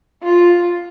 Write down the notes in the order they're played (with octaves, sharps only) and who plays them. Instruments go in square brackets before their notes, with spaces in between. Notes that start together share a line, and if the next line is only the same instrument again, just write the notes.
[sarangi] F4